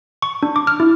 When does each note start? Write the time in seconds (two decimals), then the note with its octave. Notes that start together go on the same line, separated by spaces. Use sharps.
0.22 C#6
0.43 D4
0.56 D6
0.67 F6
0.80 E4